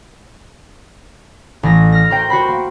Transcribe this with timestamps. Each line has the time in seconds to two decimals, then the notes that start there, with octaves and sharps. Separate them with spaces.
1.63 A1 A#6
1.92 F6 A#6
2.10 F#4 A#4 C5 G5
2.30 F#4 C5 B5
2.48 A#3